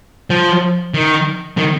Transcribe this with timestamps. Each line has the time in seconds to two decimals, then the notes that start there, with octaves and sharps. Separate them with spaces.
0.30 F3
0.94 D#3
1.57 D#3